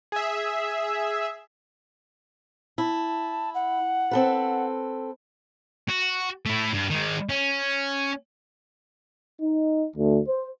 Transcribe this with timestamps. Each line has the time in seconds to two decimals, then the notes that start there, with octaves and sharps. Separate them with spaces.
0.12 G#4 E5
2.78 E4 A5
3.54 F#5
4.11 C4 A4 B4
5.89 F#4
6.46 A3 E4
6.73 G2
6.90 D#3 G#3
7.29 C#4
9.42 D#4
9.97 D2
10.28 C5